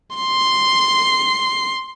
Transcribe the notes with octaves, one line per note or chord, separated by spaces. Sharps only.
C6 C7